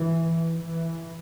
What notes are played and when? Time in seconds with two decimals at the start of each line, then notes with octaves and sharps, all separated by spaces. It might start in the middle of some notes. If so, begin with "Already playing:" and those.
Already playing: E3
0.55 E3